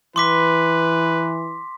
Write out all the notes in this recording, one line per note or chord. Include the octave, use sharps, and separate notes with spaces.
E3 B4 C6 D6 B6